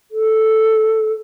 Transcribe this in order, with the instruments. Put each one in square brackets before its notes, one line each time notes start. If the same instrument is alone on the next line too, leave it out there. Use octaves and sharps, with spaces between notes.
[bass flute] A4